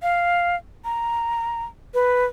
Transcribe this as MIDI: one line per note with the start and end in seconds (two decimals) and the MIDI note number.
0.02 0.56 77
0.85 1.64 82
1.94 2.25 71